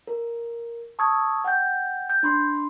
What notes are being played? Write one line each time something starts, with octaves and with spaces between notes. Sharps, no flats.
A#4
A5 C#6 D#6 E6 G#6
F#5 G5 G6
G6
D4 B5 C6